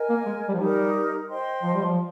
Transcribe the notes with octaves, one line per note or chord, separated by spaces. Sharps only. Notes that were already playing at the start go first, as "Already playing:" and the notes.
Already playing: A#4 D#5 G#5
A#3
G#3
G3
F3
G3 D#4 G4 A#4
C5 D#5 G5 C6
F3
G3
F3